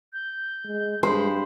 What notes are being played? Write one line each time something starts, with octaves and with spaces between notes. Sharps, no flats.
G6
G#3
G2 G#3 C5 B5